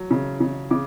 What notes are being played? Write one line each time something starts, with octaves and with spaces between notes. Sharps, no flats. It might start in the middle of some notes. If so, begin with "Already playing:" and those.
Already playing: F#3
C#3
C#3
C#3 D6